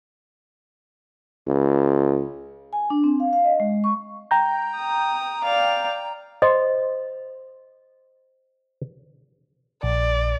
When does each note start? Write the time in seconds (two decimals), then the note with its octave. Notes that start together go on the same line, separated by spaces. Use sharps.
1.47 C#2
2.73 G#5
2.90 D4
3.04 C4
3.20 F5
3.33 F5
3.45 D#5
3.60 G#3
3.84 C#6
4.31 G5 A#5 G6
4.76 D#6
5.44 D5 F5
6.42 C5 D#5
9.83 A#1 D5